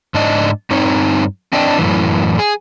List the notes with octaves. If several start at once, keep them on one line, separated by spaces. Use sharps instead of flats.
G#2 D4 D#5
G2 C4 D#4 C#5
C4 D4 D#5 G5
F#2 A2 E3
G#4